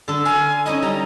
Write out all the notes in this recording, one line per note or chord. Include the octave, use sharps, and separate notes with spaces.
D3 A4
F5 G#5
C#4 D#4 E4 D#5
G3 A#5